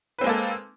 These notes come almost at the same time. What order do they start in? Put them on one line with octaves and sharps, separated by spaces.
B4 C4 G#3 A#3 A4